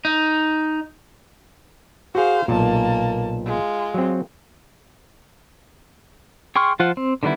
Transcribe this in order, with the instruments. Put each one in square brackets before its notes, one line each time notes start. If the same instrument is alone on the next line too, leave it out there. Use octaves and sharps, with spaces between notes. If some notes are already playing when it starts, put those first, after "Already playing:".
[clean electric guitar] D#4
[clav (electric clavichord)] F#4 G#4 [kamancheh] C5 F5
[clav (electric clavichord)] B1 A#2 [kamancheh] A#3 A5
[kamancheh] G#3 F4
[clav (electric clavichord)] F#3 C4
[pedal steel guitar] G#4 G5 C6 C#6 F6
F3 F4 C5 F#5
C4
D3 D#3 G3 B3 E4